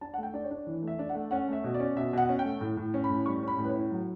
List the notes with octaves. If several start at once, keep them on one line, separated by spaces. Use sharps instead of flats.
D4 A5
A3 F#5
G5
D4 D5
C#5
D4
E3
A3
E5
D4
F#5
A3
C#4 F#5
A3 E5
B2
D5
C#4
B2 E5
B2 F#5
C#4
G5
A3
A2
A2
C#4
B5
A2
G3 C#6
C#4 B5
A2
B4
C#5
E4
F#3